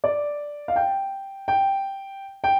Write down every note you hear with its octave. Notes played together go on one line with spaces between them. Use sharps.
D5
F5
G5
G5
G5